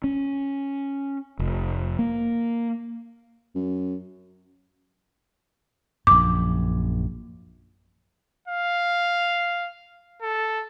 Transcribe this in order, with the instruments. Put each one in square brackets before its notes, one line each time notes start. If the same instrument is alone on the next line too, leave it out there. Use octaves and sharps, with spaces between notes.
[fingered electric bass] C#4
F1
A#3
[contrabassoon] F#2
[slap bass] A#1 F#2 [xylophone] D6
[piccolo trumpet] F5
A4